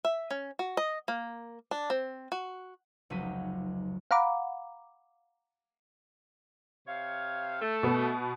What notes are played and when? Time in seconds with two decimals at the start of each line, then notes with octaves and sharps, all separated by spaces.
0.05 E5
0.31 C#4
0.59 F#4
0.77 D#5
1.08 A#3
1.71 D4
1.90 C4
2.32 F#4
3.10 F1 C#2 F#3 D#4 B6 D#7
4.11 F5 F#5 A#5 B5 D6
6.88 C3 C#5 F5
7.62 A3
7.83 B2 B3